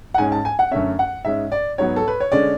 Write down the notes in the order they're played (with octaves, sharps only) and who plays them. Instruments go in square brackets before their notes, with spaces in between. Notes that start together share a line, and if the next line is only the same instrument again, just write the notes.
[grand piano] F#5
G#2 G#3 C#4 G#5
A5
G#5
F#5
F#2 D3 A3 C#4 E5
F#5
G#2 G#3 C#4 E5
D5
G#2 F#3 B3 C#5
A4
B4
C#5
D3 G#3 C#4 D5